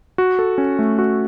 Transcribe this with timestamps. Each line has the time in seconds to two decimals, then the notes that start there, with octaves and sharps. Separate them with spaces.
0.18 F#4
0.39 A4
0.58 C#4
0.79 A3
0.98 F#4